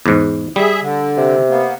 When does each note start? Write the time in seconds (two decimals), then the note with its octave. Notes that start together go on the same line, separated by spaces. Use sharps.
0.06 E2 G#2
0.56 G3 G#4 E5
0.82 D3
1.17 C3
1.50 A#3 B3